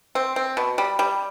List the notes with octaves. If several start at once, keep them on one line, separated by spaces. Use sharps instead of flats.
C4
C4
B2
G3
G3